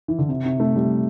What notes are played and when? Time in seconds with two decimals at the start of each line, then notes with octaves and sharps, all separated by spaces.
0.08 E3
0.19 D3
0.29 C3
0.45 C3
0.60 A3
0.76 G3